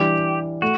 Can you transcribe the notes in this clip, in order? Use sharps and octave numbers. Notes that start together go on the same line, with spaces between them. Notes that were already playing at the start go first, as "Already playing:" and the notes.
Already playing: E3 G3 D4 G4
A3 F#4